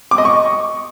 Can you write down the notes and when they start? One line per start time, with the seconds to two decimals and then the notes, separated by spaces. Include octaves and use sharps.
0.11 D6
0.18 D#5
0.25 C#6